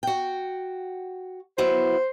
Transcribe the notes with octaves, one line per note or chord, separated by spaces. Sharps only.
F#4 G5
F#3 B3 E4 C5